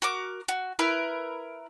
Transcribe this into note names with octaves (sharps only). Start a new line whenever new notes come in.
F#4 A#4 D6
F#4
E4 A#4 B4